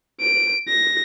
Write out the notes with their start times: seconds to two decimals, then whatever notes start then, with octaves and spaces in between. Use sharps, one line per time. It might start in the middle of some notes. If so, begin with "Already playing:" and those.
0.21 D7
0.68 A#6